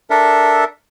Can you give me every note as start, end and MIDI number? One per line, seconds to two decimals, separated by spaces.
0.10 0.64 62
0.10 0.64 69
0.10 0.64 70
0.10 0.64 76